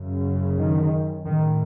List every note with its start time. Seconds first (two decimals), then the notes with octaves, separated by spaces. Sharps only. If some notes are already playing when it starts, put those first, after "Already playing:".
Already playing: F#2 C#3
0.58 D#3
1.25 A2 D#3